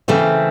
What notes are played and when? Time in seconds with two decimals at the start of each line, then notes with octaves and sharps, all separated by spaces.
0.08 C#3 E3 A3 C4